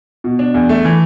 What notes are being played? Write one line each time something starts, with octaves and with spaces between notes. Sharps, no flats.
B2
D4
E2
A3
E3